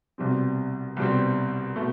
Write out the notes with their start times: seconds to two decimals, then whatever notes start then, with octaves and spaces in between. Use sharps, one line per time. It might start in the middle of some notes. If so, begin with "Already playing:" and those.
0.18 C2 B2 G3 C4
0.97 C2 B2 G3 C4
1.76 B2 A3